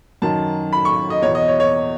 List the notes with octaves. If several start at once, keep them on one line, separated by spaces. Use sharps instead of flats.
F#2 D#3 A5
B5
C#6
D#5
E2 B2 C#5
D#5
C#5
C#5